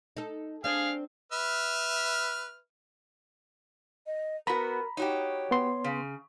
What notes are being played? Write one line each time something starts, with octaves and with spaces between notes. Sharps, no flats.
D#4 A4
C4 D4 G#4 C5 F5
B4 E5 F6
D#5
B3 F#4 A#4 A#5 B5
D#4 F#4 G4 C#5
B3 C6
C#3